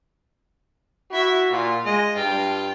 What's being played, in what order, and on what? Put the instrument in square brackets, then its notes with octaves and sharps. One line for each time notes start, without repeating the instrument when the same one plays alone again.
[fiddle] E4 E5 [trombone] F#4
[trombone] A#2 [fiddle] F4
[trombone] G#3 [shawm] D#5
[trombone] G2 [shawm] F4 [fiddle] G5